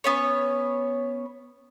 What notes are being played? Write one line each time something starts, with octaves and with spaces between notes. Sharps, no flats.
B3 C#4 C#5